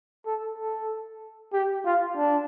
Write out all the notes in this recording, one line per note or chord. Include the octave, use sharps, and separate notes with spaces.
A4
A4
G4
F4
D4